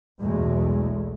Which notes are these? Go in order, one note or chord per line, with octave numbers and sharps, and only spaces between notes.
B1 E2 G#3 A3